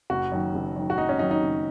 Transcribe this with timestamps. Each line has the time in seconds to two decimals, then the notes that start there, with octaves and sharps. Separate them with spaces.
0.10 F#1 F#4
0.32 F#2 D#3
0.54 F#1
0.76 F#2 D#3
0.90 F#4
0.98 F#1 D#4
1.09 C#4
1.19 F#2 D#3 D#4
1.31 D#4
1.42 F#1